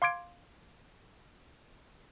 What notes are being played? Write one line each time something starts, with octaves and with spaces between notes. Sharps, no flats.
F5 C6 D6 G#6 D7